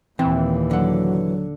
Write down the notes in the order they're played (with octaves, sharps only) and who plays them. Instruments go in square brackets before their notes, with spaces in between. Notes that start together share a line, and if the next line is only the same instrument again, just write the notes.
[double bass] D#2 A#2 [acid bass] E3 [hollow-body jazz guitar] C4
[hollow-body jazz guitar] D3 F#5 [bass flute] F#3